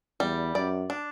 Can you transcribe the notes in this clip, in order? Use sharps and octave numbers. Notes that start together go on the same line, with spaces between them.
E2 G3
F#2 D5
D4